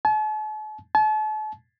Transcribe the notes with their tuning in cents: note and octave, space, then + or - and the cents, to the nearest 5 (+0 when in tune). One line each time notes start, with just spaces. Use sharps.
A5 -45
A5 -40